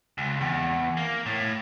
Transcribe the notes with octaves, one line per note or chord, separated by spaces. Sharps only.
C#2
E2
A#3
A2